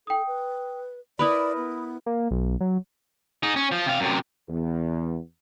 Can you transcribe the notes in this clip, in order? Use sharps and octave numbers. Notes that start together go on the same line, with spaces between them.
A4 G5 D#6
B4
E4 A#4 B4 D5 B5 D#6
B3
A#3
B1
F#3
D#4 G#4
C#4
F3
C3 F5
F#2 C3
E2